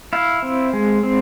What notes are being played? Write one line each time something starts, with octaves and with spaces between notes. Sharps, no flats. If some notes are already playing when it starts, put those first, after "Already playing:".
E4 F5
C4
G#3
C4